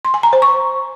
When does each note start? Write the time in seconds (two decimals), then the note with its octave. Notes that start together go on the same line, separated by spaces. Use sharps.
0.05 C6
0.14 G#5
0.23 A#5
0.33 C5
0.42 C#6